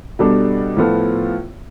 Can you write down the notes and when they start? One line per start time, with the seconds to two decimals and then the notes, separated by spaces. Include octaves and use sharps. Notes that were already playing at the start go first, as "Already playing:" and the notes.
0.19 B2 G3 D4 A4
0.77 A2 F3 B3 F4 A4